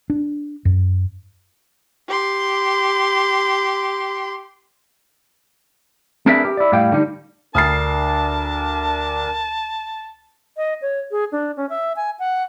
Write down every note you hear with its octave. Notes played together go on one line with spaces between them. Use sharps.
D4
F#2
G4 C6
C4 D4 G#4 A#4 B4 E5
G4
E4 D5
A2 G3 F5 G5
D3 G3 D#4
D2 D4 A#4 A5 D#6 F6 A6 C7
D#5
C#5
G#4
D4
C#4
E5
G#5
F#5